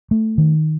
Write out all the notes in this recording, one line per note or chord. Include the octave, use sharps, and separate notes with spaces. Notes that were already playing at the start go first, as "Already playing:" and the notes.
A3
D#3